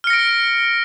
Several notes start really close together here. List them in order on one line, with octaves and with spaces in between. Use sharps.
F6 C#7 A#6 D7